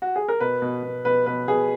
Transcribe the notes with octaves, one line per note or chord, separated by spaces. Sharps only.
F#4
G#4
A#4
B2 B4
B2
B2
B2 B4
B2 B4
B2 G#4